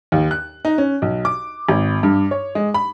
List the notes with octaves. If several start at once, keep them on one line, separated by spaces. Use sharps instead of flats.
D#2
F#6
D#4
C#4
B1
D6
G#1
G2
C#5
G#3
B5